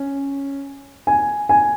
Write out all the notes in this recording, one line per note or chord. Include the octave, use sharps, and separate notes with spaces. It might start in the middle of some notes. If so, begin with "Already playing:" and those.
Already playing: C#4
G#5
G#5